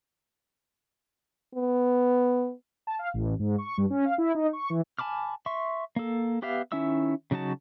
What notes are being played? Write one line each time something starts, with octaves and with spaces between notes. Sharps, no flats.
B3
A5
F5
A1
G#2
C#6
G2
C#4
F5
E4
D#4
C#6
E3
G#5 A5 B5 D6 F6
E5 C6 C#6
A#3 A4
B3 G4 B4 E5 F5
D#3 C#4 E4 E5 E6
C#3 F#3 D#4 F#4 A5